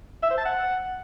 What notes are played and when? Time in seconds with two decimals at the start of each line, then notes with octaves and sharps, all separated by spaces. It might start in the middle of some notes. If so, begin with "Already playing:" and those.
0.23 E5
0.30 C5
0.38 A5
0.45 F#5